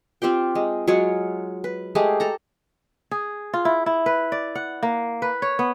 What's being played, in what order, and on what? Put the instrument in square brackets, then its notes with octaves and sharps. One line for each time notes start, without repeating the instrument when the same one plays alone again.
[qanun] C4 F4 G4 G5
G#3
F#3 G#3 F4 C#5
B4
G#3 A3 G4 G#4
A4 A#5
[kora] G#4
F4
E4
E4
B4
D5
F#5
A#3
B4
C#5
B3